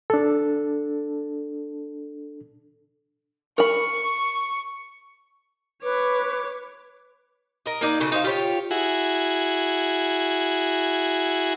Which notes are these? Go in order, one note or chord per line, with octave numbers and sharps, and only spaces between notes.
D4 A4
A#4 B5 C#6
B4 C#5 D6
A#4 D#5
A#3 D#4 D5
C#3 D#4 F#4 A4
D#4 C5 F5
F4 G4 C5 C#5
E4 F#4 G#4